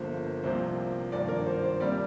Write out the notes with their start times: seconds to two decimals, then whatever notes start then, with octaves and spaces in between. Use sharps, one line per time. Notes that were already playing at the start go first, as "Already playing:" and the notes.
Already playing: G1 G2 F3 A#3 C5
0.44 C2 C3 F3 A#3 C5
1.12 G#1 G2 F3 A#3 D5
1.29 A#4
1.46 C5
1.63 C5
1.80 C3 G3 A#3 D5